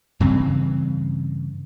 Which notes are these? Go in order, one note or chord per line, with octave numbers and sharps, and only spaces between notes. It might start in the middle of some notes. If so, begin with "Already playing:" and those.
G2 C#3 E3 C4